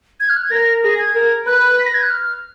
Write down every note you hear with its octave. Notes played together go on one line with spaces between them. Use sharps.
G#6
F6
F#6
G#6
A#4 A#6
G#4 A#6
G#6
A#4
B4 F#6
B6
A#6
G#6
F#6
F6